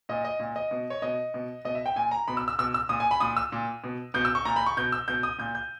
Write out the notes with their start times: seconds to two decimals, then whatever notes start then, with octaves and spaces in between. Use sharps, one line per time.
0.09 A#2 D#5
0.25 D#5
0.40 A#2
0.56 D#5
0.71 B2
0.90 C#5
1.02 B2 D#5
1.34 B2
1.65 B2 D#5
1.75 E5
1.86 G5
1.96 A#2 G#5
2.11 A#5
2.28 B2 B5
2.37 E6
2.48 E6
2.59 B2 E6
2.74 E6
2.89 A#2 D#6
3.00 G#5
3.11 B5
3.20 A#2 D#6
3.37 E6
3.52 A#2
3.84 B2
4.14 B2 G6
4.25 E6
4.35 C#6
4.45 A#2 A#5
4.56 B5
4.66 C#6
4.77 B2 G6
4.92 E6
5.08 B2 G6
5.23 D#6
5.39 A#2 G6
5.55 G6